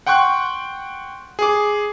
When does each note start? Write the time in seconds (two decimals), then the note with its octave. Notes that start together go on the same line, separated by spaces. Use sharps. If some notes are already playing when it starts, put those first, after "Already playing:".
0.07 F#5 G5 C6 C#6 F#6
1.39 G#4 D6